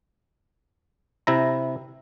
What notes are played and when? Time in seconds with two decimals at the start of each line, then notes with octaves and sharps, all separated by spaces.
1.27 C3 E4 A#5